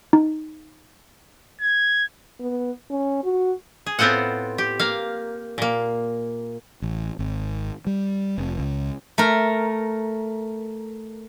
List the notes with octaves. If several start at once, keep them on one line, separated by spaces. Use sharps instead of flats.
D#4
G#6
B3
C#4
F#4
G#4
A2 B3 C4 F4 C5 F#5
G4
A#3 F5
A#2 A#3
A1
G#1
G3
F1
C#2
A3 A#4